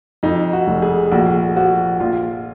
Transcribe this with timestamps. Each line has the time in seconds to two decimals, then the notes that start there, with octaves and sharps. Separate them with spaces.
0.23 F2 D#4
0.53 F#4
0.67 F1
0.82 G#4
1.12 A#1 F#4
1.56 F3 F#4
2.00 A#1 F4